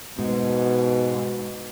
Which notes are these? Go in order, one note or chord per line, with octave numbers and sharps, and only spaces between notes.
G#2 B2